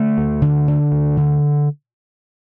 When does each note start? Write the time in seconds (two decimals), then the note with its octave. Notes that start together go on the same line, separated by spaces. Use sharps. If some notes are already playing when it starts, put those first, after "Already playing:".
Already playing: D3 A3
0.18 D2
0.42 D3
0.68 D3
0.92 D2
1.17 D3